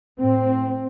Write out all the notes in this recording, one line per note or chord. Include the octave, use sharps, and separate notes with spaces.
A2 C4